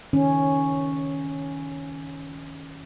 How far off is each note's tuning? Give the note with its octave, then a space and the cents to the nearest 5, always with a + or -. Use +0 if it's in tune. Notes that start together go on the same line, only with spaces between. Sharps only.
D#3 +20 C#4 +0